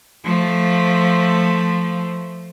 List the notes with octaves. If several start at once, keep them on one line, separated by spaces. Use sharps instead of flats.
F3 A3